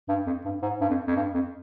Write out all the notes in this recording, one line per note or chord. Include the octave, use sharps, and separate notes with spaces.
G2
F2
G2
G#2
G2
F2
F2
G2
F2